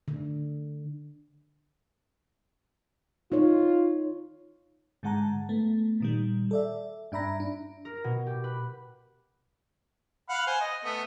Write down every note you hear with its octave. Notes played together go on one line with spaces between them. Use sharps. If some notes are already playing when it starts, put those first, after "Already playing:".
D3
D#4 F4 C#5
G#2 D3 G#3 F#5 A5 A#5
A3 B3
A#2 D#3 G3
A4 D5 E5
G2 D4 E5 A#5 B5 A#6
D4
A#4
B2
G4
B4
F5 F#5 B5
C5 G#5
D#5
A3 B3